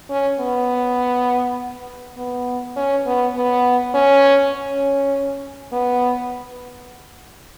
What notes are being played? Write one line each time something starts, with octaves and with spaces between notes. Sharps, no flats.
C#4
B3
B3
C#4
B3
B3
C#4
C#4
B3